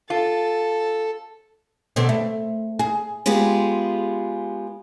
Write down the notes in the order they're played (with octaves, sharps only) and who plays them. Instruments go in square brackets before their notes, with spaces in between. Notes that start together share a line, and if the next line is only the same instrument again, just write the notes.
[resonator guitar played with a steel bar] F4 [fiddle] A4
[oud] B2 D3 C4
A3
G#4
[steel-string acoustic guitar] G#3 B3 F4 G4 G#4